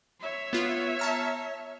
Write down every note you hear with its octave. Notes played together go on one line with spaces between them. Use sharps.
C#5 E5
B3 F4
A5 A#5 F6